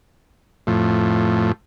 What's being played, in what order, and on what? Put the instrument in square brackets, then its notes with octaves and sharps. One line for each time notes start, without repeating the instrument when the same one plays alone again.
[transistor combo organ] F2 A2